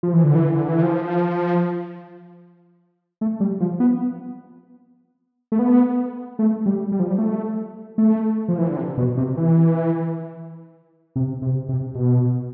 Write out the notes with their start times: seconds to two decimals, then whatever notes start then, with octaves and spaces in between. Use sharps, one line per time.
0.03 F3
0.13 E3
0.24 D3
0.35 E3
0.55 D3
0.69 E3
0.82 F3
3.21 A3
3.40 G3
3.61 F3
3.80 B3
5.52 A3
5.59 B3
6.39 A3
6.66 G3
6.92 G3
7.00 F3
7.08 G3
7.18 A3
7.98 A3
8.48 F3
8.58 E3
8.68 D3
8.77 C3
8.97 B2
9.17 C3
9.37 E3
11.16 C3
11.42 C3
11.69 C3
11.95 B2